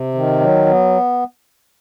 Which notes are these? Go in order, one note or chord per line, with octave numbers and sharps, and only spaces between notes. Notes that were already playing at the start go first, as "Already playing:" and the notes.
Already playing: C3
D#3
F#3
B3